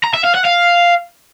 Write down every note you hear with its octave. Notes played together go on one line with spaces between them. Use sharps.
A#5
E5
F5
F#5
F5